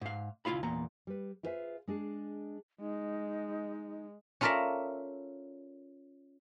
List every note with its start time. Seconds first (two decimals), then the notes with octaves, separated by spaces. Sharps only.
0.01 G#2 F5
0.45 C#2 E4 F4 F5 B5
0.63 E2 A#2 A#5
1.07 G3 B4
1.43 E4 F4 G#4 B4 C5 E5
1.87 G#3 D4 G#4
2.80 G#3 D#4
4.41 C#4 F4 A4 A#4 D5 E5